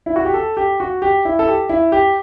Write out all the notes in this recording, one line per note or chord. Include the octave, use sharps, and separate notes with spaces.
E4
F#4
G4
A4
G4
F#4
G4
E4
A4
G4
E4
G4